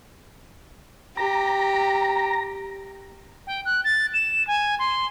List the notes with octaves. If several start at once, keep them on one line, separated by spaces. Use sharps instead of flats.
G4 A#5
G5
F#6
A6
E7
G#5
C6